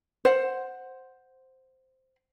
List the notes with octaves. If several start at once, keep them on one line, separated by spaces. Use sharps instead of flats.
C5 F#5